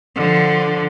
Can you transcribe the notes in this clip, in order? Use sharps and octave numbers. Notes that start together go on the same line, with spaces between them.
D3 F3